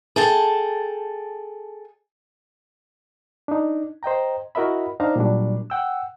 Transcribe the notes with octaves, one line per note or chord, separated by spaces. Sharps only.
G#4 A4 G5 A5
D4 D#4
C5 D#5 G5 A#5
E4 F#4 A#4 D#5 E5 B5
D4 D#4 C5 F5 A#5
A#2 F#3 G3 D4
F#5 G5 E6